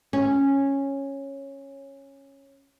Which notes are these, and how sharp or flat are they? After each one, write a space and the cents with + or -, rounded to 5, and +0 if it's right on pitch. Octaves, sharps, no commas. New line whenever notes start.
C#4 -10